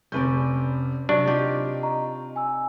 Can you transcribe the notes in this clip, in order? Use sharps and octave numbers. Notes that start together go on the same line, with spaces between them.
F1 C3 C#4 B4 D5 G6
C3 F#3 D4 C#6
D#4 F4 G4
D#5 A#5 C#6
G#5 E6